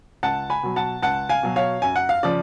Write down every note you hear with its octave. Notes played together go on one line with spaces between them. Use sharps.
C#2 F#5 A5
G#5 B5
B2 F#3
F#5 A5
C#2 F#5 A5
F5 G#5
B2 F#3
C#5 F5
F#2 G#5
F#5
F5
C#3 F3 D5